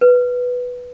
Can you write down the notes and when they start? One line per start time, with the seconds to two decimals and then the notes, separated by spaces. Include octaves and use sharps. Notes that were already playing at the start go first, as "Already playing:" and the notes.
0.01 B4